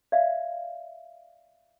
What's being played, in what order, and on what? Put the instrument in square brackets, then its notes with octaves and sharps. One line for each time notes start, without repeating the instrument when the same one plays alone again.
[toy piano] D5 E5 F5